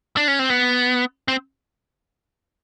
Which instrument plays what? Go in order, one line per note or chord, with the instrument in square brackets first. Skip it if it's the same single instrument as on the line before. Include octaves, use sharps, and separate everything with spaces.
[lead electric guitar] D4
C#4
C4
B3
C4